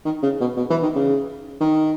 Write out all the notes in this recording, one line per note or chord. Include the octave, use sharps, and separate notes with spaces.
D#3
C#3
B2
B2
E3
D#3
C#3
D#3